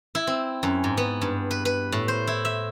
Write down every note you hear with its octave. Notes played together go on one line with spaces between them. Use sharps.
E4
C4
F#2
G#2
B3
G2
B4
B4
A2
C5
E4
E5